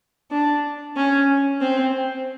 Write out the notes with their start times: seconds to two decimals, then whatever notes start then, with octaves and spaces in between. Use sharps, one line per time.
0.31 D4
0.97 C#4
1.61 C4